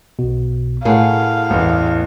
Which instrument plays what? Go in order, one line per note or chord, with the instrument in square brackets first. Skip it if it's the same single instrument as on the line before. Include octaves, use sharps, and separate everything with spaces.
[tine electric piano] B1 B2
[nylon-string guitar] A2 G#4 [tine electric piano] A#4 F#5 [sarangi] F5
[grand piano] A1 E2